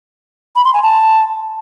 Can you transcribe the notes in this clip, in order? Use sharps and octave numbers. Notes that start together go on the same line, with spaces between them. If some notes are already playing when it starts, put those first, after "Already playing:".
B5
C6
G#5
A5